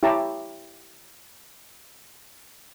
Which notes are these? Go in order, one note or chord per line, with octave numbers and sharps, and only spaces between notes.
E4 G4 C#5 A5 A#5